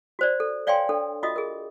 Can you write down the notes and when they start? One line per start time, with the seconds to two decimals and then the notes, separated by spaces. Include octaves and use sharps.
0.19 F#4 C5 D5
0.40 A4
0.67 C#5 D5 F5 G5 G#5 C6
0.89 D4 A4
1.23 F4 F#4 D#5 E5 D#6
1.36 G#4 A#4